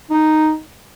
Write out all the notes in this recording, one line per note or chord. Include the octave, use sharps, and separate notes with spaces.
D#4